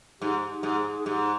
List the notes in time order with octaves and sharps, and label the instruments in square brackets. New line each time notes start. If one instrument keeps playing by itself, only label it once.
[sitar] G#2 [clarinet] G4
[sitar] G#2 [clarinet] G#4
[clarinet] G#4
[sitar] G#2 [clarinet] G4